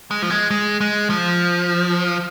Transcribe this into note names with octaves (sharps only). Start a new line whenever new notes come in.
G#3
F3
G#3
G#3
G#3
F3